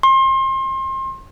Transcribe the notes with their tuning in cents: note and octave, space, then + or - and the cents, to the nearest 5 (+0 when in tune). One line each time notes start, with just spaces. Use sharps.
C6 +30